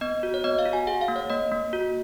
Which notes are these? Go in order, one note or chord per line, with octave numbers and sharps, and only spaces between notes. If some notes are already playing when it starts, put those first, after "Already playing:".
B3 D#5
F#4
C#5
B3 D#5
F5
F#4
G#5
G#4 F#5
F5
A#3
C#5
A#3 D#5
A#3
F#4